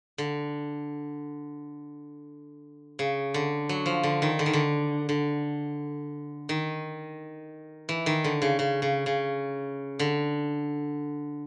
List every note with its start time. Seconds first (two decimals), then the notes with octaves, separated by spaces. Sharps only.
0.18 D3
2.99 C#3
3.34 D3
3.69 F#3
3.86 F3
4.03 D3
4.22 D#3
4.39 D3
4.46 D#3
4.53 D3
5.09 D3
6.49 D#3
7.89 E3
8.06 D#3
8.24 D3
8.42 C#3
8.59 C#3
8.82 C#3
9.06 C#3
9.99 D3